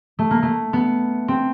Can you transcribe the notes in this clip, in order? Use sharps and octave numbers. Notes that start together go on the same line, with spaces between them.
A3
A#3
A3
B3
C4